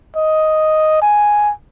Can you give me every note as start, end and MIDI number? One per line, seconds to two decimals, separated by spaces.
0.16 1.00 75
1.02 1.52 80